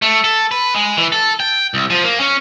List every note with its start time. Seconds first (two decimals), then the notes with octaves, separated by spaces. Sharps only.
0.02 A3
0.24 A4
0.51 B4
0.75 G#3
0.97 E3
1.12 A4
1.40 G5
1.74 C2
1.90 F3
2.04 A#3
2.20 C#4